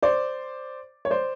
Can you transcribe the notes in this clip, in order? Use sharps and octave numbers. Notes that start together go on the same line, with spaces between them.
C5 D5
C#5
C5 D5